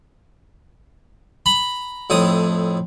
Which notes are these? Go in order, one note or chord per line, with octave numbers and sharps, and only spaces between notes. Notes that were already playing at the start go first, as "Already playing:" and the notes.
A#5 B5
F2 A2 D#6